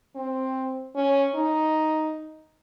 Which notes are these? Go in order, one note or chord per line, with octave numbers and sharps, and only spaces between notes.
C4
C#4
D#4